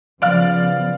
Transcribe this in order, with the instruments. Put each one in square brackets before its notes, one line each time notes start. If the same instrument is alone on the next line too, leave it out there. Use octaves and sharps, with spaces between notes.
[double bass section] C#3 F3 B3 [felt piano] D5 F5 F6